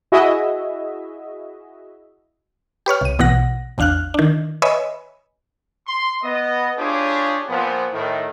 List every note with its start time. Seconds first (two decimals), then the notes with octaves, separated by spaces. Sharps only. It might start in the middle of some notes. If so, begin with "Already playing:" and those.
0.12 E4 F#4 G#4 D#5 E5
2.86 G4 B4 C#5 F6
3.01 C2 D#7
3.19 A#1 B2 E3 F#5 A#6
3.78 A1 E2 D4 F5 F6 F#6
4.14 D#3 D4
4.62 B4 C#5 D#5 E5 G#5 B5
5.87 C6
6.23 B3 D#5
6.78 D4 F4 G4 G#4 C#5
7.48 A#2 F3 B3
7.93 A2 D#3